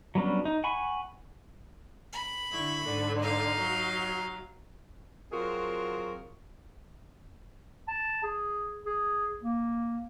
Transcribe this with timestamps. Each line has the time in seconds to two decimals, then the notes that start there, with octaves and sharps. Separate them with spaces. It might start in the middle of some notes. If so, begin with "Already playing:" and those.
0.15 F#3 G3 B3 C#4 D4
0.45 D#4
0.64 F#5 G#5 B5 C#6
2.13 B5
2.51 D3 E4 C#6
2.84 G#2 D3
3.19 D#4 F5
3.59 F#3
5.32 F#3 C4 F4 F#4 G#4 A#4
7.88 A5
8.23 G#4
8.86 G#4
9.42 A#3